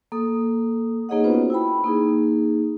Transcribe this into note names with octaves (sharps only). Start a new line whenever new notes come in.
A#3 A4 D#6
A#3 D#4 G#4 C#5 D#5 F#5
B3 C#4 F4 F#4 B4 C5
E4 G5 B5
A#3 D#4 G#4